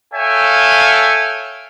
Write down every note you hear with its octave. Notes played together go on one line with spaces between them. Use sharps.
A4 C#5 E5 F5 G5 G#5